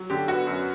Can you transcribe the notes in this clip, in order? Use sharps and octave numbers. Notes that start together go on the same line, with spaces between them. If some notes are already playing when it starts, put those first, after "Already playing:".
Already playing: F#3
D3 G4
B3 F#4
F#2